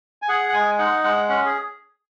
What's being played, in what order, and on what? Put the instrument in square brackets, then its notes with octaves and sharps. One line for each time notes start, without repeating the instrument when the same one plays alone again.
[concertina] G#5
G#4 F#5
F#5
G#3 G#5
D#4 F#5
G#3 F#5
C#4 F#5
G#4